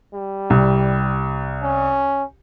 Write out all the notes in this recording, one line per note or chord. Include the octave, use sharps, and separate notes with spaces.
G3
C2
C#4